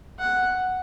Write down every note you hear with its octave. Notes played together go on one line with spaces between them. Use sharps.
F#5